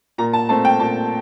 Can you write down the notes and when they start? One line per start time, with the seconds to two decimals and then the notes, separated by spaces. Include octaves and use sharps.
0.18 A#2 A#5
0.33 A5
0.49 A3 C4 A5
0.65 G5
0.80 A#2 A5